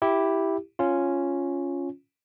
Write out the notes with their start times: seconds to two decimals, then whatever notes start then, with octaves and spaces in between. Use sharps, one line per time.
0.02 E4 G4
0.79 C#4 F4